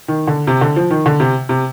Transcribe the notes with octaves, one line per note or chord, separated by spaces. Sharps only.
D#3
D3
C3
D3
F3
D#3
D3
C3
C3